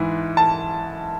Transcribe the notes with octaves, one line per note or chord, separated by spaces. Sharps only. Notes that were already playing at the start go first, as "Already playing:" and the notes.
Already playing: G#2 E3
A5